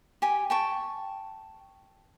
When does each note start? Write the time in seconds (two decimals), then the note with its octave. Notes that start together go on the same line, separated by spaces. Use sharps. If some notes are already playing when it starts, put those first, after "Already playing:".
0.22 G4 G#5
0.50 G5 A5 C#6